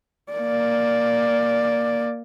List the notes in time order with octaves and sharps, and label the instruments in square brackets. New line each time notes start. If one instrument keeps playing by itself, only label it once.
[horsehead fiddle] A#3 D5